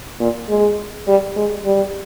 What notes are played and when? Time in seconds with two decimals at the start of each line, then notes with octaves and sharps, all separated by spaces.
0.20 A#2
0.49 G#3
1.08 G3
1.36 G#3
1.65 G3